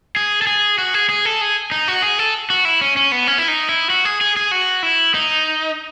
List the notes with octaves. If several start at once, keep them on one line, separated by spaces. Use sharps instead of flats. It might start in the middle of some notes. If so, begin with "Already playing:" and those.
G#4
A4
G#4
F#4
G#4
G#4
A4
G#4
D#4
F#4
G#4
A4
F#4
E4
C#4
C#4
B3
C#4
E4
D#4
E4
F#4
G#4
G#4
G#4
F#4
E4
D#4